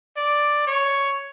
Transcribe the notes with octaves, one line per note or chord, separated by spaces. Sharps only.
D5
C#5